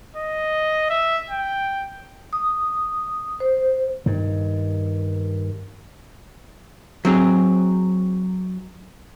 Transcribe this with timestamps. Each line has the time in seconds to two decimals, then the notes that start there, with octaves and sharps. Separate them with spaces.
0.16 D#5
0.90 E5
1.30 G5
2.33 D#6
3.40 C5
4.06 G2 D#3
7.05 F#3 C4 G#4